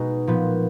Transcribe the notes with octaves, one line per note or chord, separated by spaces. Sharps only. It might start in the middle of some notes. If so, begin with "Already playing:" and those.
Already playing: B2 G#3 D#4 F#4
A#2 F3 B3